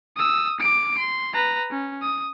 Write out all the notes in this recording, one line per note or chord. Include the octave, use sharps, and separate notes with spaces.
D#6 E6
D6 D7
C6
B4 A#5
C#4
D#6